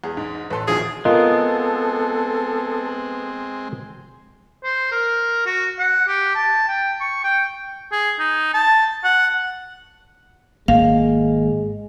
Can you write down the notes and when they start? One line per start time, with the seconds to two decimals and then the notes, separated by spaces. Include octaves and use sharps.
0.04 E2 G#4
0.17 G#2
0.50 A1 A4 B4 C6
0.68 A#1 D#2 B2 D#3 F3 G#4
1.05 G#3 B3 C4 F4 A4 A#4 D#5
4.64 C5
4.92 A#4
5.46 F#4
5.79 F#5
6.08 G4
6.35 A5
6.68 G5
7.01 C#6
7.24 G5
7.92 G#4
8.19 D#4
8.54 A5
9.04 F#5
10.68 G#1 G#3 A#3 F5